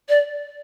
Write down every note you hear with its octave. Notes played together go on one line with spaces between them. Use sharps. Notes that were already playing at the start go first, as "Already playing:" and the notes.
D5